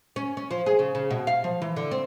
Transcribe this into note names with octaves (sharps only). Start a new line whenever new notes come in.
C#4
C#4
F3
G#4
C#3
C#3
B2
F5
F3
E3
D3
C4